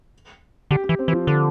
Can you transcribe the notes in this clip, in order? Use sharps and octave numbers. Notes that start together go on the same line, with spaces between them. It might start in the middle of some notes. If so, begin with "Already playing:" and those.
D3 G4
G4
E3
C4
E3
F3
D3